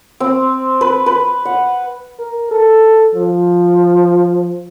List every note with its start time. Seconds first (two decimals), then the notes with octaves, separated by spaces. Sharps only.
0.20 C4
0.81 B4
1.06 B4
1.45 F#5
2.19 A#4
2.51 A4
3.15 F3